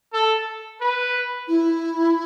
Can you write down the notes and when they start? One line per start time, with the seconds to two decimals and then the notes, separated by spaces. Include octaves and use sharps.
0.13 A4
0.81 B4
1.48 E4